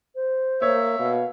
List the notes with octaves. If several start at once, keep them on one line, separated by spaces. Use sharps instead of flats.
C5
A#3 C#5 E5
B2 F5